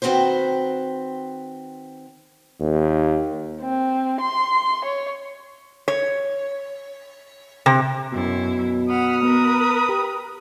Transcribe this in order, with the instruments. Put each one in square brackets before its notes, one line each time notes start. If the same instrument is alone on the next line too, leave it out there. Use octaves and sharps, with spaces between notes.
[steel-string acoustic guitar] D#3 C4 F#4 B4 C5
[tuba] D#2
[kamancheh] C4
C6
C#5
[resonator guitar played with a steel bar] C#5
C3
[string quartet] F#2 E4 [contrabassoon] B2
[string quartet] F#5 B5 F6 [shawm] D#6
[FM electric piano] B3 [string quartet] A#4 B4 B5
[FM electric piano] G4